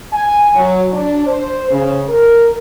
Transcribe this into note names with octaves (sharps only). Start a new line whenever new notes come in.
G#5
F#3
D4
C5
C#3
A#4